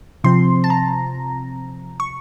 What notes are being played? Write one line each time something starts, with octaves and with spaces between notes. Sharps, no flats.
C3 F3 C4 C6
A5
A#5
C#6